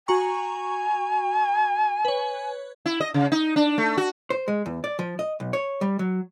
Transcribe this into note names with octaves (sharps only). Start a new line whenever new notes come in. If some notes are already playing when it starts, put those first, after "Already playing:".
F#4 G#5 A#5 C#6
B4 C#5
E4
D#5
C#3
D#4
D4
A3
F#4
C5
G#3
E2
D5
F3
D#5
B1
C#5
G3
F#3